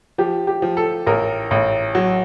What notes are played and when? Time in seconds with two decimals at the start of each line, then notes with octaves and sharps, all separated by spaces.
0.18 F3 G4
0.47 G4
0.62 F3
0.77 A4
1.07 A1 A#4
1.51 A1
1.95 F#3